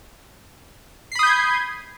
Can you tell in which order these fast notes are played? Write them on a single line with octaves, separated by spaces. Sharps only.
C7 B5 D#6 G6 G#6